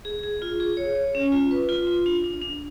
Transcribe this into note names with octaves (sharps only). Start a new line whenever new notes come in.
G#4
G#4
F4
G#4
C#5
C#5
C#4
F4
B4
F4
F4
D4
D4
D4